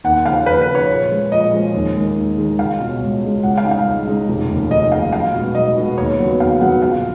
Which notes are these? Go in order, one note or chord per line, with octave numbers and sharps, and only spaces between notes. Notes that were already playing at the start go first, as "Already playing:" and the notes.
D#2 F#5
C#3 F3 F5
D#2 B4
B4
C#3 F3
C#5
A#2
F3 G#3 C#4
A#2 D#5
F3 G#3 C#4
D#2
D#3 G#3
D#2
D#3 G#3
C#2 F5
B2 G#3 C#4 F4
C#2
B2 G#3 C#4 F4
C#2 F#5
F5
C#3 G#3 D#4
F5
C#2
C#3 G#3 D#4
F1
D#2 C#3
F1 D#5
D#2 C#3 F5
B1 F5
B2 G#3 B3
B1 D#5
B2 G#3 B3
D#2 C#5
C#3 F#3 B3
D#2 F5
C#3 F#3 B3 F#5
A#1 F5